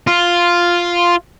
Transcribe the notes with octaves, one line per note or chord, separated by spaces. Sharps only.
F4